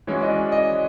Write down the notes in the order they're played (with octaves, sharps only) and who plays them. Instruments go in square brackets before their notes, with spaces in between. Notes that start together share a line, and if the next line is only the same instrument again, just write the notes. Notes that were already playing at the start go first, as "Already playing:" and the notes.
[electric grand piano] E3 G#3 C#4 F#4 [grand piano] C#5
[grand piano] D#5
D5
D#5